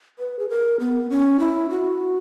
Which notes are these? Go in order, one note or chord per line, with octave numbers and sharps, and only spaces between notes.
B4
G#4
A#4
B3
C#4
E4
F#4